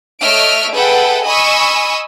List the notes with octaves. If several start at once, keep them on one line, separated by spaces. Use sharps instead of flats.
A3 C#5 D#5 E5 F6 D7
G#4 A4 B4 E5 F#5 G5
D#5 G#5 B5 C#6 D#6 E6